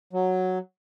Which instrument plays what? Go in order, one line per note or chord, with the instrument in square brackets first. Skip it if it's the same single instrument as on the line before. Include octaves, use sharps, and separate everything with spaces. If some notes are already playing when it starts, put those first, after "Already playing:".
[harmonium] F#3